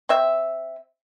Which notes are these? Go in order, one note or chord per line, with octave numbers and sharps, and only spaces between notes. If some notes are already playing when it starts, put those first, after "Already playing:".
C4 E5